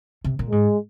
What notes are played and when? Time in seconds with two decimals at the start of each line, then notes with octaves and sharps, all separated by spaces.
0.24 C3
0.39 A#2
0.50 G#2 G#3